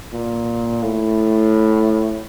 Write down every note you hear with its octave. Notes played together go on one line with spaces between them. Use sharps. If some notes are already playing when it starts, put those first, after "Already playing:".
A#2
A2